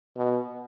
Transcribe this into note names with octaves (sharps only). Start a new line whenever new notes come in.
B2